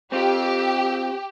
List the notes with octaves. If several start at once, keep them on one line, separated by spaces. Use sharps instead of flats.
C4 F4 G4